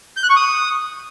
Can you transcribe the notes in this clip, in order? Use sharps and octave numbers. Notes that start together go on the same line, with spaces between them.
G6
F#6
C#6
D#6